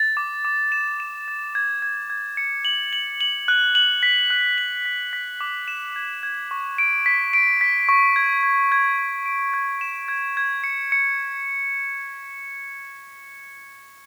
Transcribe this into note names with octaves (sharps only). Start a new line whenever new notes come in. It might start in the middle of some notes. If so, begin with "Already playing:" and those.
Already playing: A6
D6
D6
E7
E7
A6
G#6
G#6
G#6
C#7
F#7
F#7
F#7
F#6
F#7
B6
F#6
F#7
B6
B6
D6
E7
G#6
G#6
C#6
D7
B6
D7
B6
C#6
G#6
G#6
G#6
G#6
D7
G#6
E7
G#6
G#6
C#7
C#7